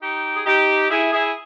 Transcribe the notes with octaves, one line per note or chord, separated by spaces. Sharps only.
D#4 G4
G#4
D#4 G4
E4 G#4
E4 G#4